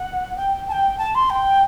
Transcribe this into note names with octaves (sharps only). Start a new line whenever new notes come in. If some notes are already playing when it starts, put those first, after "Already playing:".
Already playing: F#5
G5
A5
G5
A5
C6
G5